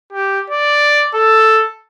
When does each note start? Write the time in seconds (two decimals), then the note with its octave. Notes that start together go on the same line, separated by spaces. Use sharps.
0.13 G4
0.50 D5
1.14 A4